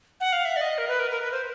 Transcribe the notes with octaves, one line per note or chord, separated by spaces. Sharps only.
F#5
F5
E5
D5
D#5
A#4
B4
A#4
A#4
B4
C5